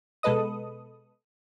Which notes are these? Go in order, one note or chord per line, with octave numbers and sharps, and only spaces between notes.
B2 G#3 A4 B4 D#5 D#6